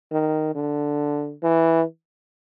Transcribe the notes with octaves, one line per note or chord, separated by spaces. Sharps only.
D#3
D3
E3